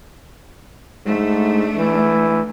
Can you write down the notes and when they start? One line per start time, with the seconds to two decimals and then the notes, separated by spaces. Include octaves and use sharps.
1.06 G#2 A3 D4
1.76 E3